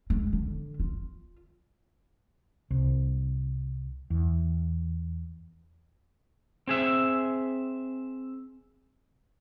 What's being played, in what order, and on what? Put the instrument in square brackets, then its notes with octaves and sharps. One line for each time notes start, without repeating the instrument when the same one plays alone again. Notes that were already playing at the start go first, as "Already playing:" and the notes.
[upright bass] G#3
D3
F4
[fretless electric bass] C2
E2
[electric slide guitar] C4 G#4 E5